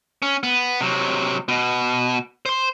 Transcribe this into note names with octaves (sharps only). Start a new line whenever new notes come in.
C#4
B3
C3 F#3
B2
C5 C6